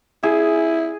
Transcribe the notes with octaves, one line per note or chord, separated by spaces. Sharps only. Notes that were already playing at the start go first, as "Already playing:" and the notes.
E4 G#4